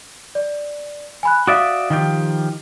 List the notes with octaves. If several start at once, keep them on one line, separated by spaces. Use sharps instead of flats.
D5
G#5 B5 F#6
F#4 D5 E5 F5 D#6
D#3 F3 G4